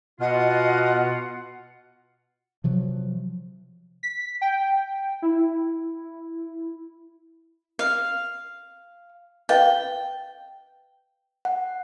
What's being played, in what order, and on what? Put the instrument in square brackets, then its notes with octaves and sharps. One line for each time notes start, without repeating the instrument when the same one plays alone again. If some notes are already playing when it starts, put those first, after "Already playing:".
[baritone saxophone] B2 [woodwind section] F4 [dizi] D#5 [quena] F#5
[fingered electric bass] C3 F3 F#3
[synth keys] B6
G5
E4
[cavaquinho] F5
[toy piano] B4 D#5 F5 [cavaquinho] G5
[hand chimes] F#5